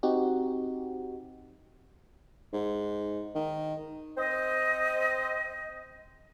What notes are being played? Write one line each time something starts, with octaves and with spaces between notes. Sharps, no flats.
C4 D#4 F#4 G4
G#2
D#3
C4 C5 D#5